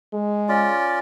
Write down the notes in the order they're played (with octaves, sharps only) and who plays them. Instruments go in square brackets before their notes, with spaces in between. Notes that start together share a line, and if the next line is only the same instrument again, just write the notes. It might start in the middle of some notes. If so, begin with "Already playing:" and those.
[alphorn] G#3
[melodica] C#4 F4 D5